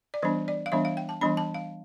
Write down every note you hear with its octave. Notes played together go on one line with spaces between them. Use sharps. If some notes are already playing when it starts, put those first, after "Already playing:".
D5
E3 G3 B3 D4 C5
D5
F5
E3 G3 B3 D4 E5
F5
G5
A5
E3 G3 B3 D4 B5
A5
F5